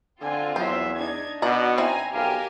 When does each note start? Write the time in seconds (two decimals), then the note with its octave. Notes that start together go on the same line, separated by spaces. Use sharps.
0.21 D3 C4 F4 G#5
0.56 E2 F#3 C5 E5
0.96 D4 D#4 G#6
1.42 B2 F#4 D5 D#5 A#5
1.78 C4 E4 G#5 A#5
2.13 B1 G4 A#4 F5 G#5